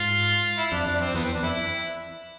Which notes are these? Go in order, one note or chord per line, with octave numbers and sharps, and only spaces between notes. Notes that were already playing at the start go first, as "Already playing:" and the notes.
Already playing: G#2 F4
E4
F2 D4
F2 D4
C4
E2 B3
C4
D4
F2 E4